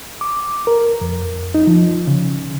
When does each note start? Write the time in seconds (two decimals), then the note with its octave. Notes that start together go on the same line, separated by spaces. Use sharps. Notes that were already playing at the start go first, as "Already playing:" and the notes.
0.21 D6
0.67 A#4
1.01 F2
1.55 D#4
1.67 F3
2.07 C#3